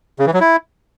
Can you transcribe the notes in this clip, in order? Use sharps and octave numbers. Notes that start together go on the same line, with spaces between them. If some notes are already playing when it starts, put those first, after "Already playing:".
C#3
E3
F#3
E4